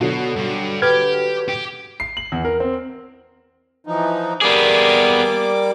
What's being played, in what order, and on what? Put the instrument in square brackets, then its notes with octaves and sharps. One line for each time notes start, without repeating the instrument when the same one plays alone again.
[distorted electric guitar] B2 [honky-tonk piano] D3 F#3 F#4
[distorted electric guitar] G2
[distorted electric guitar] G4 [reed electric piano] B4 F6 G#6
[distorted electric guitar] G4
[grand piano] C7
F#7
E2
A#4
C4
[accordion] E3 F3 D#4
[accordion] G3 A#3 D6 [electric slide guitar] B3 G#4